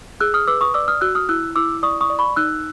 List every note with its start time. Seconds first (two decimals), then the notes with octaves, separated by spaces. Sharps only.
0.20 G#4 E6 F#6
0.34 D#6 F6
0.48 B4 D6 E6
0.61 C#6 D#6
0.74 D5 D6 E6
0.88 D#6 F6
1.01 F#4 E6 F#6
1.15 D#6 F6
1.29 E4 E6 F#6
1.56 E4 D6 E6
1.83 D5 C#6 D#6
2.01 C#6 D#6
2.10 D5
2.19 B5 C#6
2.36 D#4 E6 F#6